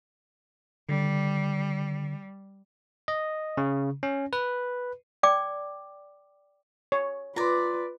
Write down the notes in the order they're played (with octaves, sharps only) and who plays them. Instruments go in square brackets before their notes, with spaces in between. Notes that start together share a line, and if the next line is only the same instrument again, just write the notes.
[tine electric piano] D3 [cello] G3
[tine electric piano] D#5
C#3
C#4
B4
[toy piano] D5 G5 D6
[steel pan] C#5
[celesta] F4 C6 [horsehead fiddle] B4 [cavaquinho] D5 A#5